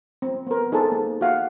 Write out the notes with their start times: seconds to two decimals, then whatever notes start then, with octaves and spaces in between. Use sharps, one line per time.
0.22 C4
0.47 B3 A#4
0.72 D#4 G#4 A4 C5 A5
0.92 A#3
1.21 F#4 F5 F#5